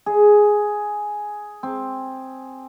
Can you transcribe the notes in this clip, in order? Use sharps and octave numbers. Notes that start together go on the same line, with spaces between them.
G#4
C4